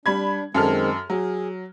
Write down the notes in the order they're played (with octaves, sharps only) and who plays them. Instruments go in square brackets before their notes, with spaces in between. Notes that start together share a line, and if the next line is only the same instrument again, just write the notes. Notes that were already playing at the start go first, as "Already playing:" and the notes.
[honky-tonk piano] G3 B5 G#6 [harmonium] D4
[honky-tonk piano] F#2 A4 F6 [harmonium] D#3 G#3 C4
[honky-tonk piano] F#3 [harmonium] G#4